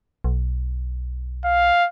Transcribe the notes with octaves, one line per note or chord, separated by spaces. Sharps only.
B1
F5